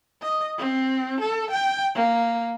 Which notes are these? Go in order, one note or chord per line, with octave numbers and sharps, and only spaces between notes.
D#5
C4
A4
G5
A#3